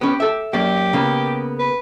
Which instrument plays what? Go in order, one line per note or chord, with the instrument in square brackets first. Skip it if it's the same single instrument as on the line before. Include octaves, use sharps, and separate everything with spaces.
[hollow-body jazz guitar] B3 C#4 [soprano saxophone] G4
[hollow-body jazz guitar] A4 E5
[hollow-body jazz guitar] F#2 A#3 D5 [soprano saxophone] G4
[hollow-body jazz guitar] C#3 A#3 B3
[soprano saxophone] B4